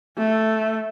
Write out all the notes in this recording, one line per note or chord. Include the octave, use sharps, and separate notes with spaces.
A3